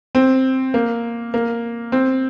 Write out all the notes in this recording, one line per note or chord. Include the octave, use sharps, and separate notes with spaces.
C4
A#3
A#3
C4